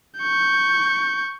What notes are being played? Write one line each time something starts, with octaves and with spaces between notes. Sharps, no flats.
C#6 G6